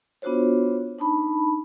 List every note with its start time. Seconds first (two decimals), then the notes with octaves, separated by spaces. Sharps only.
0.22 B3 D4 F4 F#4 C5 C#5
0.99 D4 D#4 A5 B5